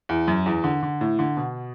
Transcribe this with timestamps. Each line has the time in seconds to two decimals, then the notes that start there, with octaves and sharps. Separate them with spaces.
0.09 E2
0.28 F#2
0.46 E2
0.64 D3
0.83 D3
1.01 A2
1.19 D3
1.37 B2